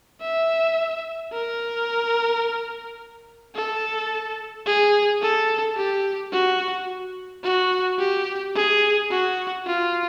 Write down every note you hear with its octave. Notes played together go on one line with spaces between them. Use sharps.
E5
A#4
A4
G#4
A4
G4
F#4
F#4
G4
G#4
F#4
F4